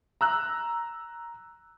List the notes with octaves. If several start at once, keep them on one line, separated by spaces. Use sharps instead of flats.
A#5 E6 F#6